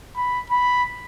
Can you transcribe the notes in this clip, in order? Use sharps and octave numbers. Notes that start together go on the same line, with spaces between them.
B5
B5